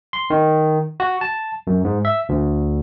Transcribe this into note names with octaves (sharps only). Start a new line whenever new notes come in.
C6
D#3
F#4
A5
F#2
G#2
E5
D2